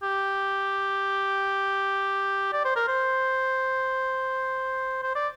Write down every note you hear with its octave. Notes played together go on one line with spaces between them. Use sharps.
G4
D5
C5
A#4
C5
C5
D5